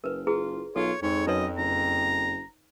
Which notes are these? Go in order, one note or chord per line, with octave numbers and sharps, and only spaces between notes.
F#1 A#4 B4
E4 F4 G#4 B4
B1 F4 A4 C#5
F2 G#2 C#5
F#2 D#4 B4 C#5 D#5
F#1 A#5